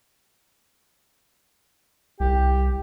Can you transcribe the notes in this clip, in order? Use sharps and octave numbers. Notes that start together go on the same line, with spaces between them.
C2 G4